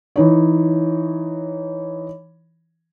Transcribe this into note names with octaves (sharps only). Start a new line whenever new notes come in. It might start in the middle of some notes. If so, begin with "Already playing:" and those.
E3 D#4 C#5